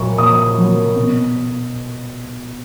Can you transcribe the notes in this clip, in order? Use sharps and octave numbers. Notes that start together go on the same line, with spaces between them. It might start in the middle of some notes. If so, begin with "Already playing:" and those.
Already playing: A#2 F#3 A#3 C#6
A#2 D#6
F#3 A#3
B2